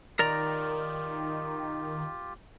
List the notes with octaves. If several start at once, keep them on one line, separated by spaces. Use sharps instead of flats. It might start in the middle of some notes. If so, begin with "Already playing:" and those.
D#3 F4 G4 A#4 D5 A#5